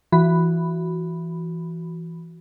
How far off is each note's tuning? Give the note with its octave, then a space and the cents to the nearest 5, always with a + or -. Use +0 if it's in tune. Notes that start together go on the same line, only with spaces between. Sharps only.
E3 +20 F#4 +0 B5 +5